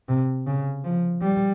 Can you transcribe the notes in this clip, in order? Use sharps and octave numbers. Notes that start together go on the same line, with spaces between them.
C3
C#3
F3
G3